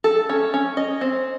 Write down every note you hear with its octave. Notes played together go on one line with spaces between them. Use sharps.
A4
C#4
C#4
D#5
C4